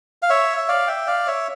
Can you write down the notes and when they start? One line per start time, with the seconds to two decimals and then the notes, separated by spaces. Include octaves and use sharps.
0.22 F5
0.30 C#5 E5
0.57 E5
0.68 D5 F5
0.87 E5 G5
1.07 D5 F5
1.27 C#5 E5